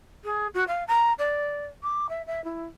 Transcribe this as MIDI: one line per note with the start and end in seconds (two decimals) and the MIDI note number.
0.24 0.47 68
0.54 0.64 66
0.67 0.83 77
0.87 1.13 82
1.18 1.64 74
1.83 2.07 86
2.09 2.22 76
2.26 2.43 76
2.44 2.64 64